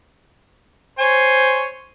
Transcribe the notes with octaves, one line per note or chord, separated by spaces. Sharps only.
C5 C#5 G#5